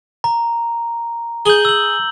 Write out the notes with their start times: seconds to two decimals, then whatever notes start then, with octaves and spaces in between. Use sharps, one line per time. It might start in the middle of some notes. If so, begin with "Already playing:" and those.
0.24 A#5
1.46 G#4 G6 F#7 G7
1.65 E6 F#7